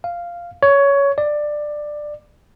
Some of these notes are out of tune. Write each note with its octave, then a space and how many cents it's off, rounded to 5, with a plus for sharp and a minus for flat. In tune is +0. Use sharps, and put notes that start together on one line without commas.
F5 -5
C#5 +15
D5 +15